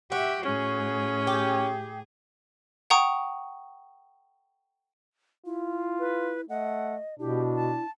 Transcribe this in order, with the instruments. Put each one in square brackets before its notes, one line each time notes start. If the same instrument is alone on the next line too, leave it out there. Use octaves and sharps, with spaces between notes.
[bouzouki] F#4 [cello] G4 E5
[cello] A2 G#4 [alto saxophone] C#4
[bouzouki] G4
[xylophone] F#5 G5 A#5 C#6 D#6
[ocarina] E4 [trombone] F4
[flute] B4
[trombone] A3 [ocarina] D#5 [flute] F#5
[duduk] B2 [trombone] D4 [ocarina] E4 [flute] G4
[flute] A5